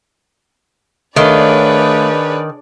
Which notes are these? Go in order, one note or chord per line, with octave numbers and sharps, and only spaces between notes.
D#3 A3 D4 G#4 B4 C#5 D5 F5